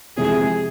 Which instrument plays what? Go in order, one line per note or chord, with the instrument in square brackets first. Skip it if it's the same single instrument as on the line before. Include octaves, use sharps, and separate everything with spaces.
[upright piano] F2 C3 E3 G#3 [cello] G#4